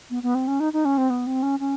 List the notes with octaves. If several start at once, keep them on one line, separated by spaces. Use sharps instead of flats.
B3
B3
C4
C#4
D#4
D#4
C#4
C4
B3
C4
C#4
C#4